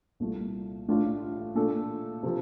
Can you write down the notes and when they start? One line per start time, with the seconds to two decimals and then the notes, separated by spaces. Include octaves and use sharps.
0.20 C2 A#2 A3
0.88 A1 A2 A3 D4 F4
1.55 A#2 A3 D4 A4
2.23 C3 F3